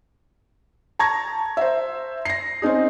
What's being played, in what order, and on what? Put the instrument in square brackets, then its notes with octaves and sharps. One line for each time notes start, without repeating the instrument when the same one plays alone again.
[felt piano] A5 A#5 C#6 G#6 A#6
C5 E5
A#6 C7
C4 C#4 D#4 G#4